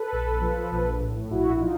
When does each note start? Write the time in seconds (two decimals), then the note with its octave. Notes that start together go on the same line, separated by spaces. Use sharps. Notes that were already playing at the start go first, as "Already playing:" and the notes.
Already playing: A4 B4
0.12 A#1
0.41 F3
0.71 A#1
1.00 A2
1.31 A#1 E4 F#4
1.60 F3 D#4 F4